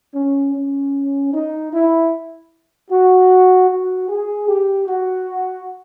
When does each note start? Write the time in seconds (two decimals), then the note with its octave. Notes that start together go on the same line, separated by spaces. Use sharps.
0.14 C#4
0.55 C#4
1.33 D#4
1.73 E4
2.91 F#4
3.69 F#4
4.09 G#4
4.48 G4
4.87 F#4